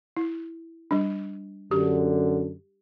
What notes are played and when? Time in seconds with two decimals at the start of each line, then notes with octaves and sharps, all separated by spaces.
0.17 E4
0.91 G3 D4
1.71 F#2 D3 G4